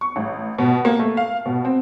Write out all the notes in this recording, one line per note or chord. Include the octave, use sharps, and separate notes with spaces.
C#6
A1
B2
A#3
A3
F5
B2
C4